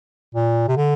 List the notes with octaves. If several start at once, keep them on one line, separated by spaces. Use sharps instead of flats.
A#2
C3
D3